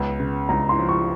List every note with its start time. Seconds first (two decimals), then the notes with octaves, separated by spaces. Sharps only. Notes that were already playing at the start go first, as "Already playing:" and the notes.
Already playing: C#2 B3
0.20 C#3
0.49 C#2 A#5
0.69 C6
0.79 F3
0.89 C#6